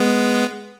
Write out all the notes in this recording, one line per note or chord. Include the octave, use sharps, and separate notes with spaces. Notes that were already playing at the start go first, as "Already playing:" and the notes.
Already playing: G#3 B3